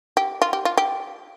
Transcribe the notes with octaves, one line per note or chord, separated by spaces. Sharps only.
G4
F4
G4
F4
G4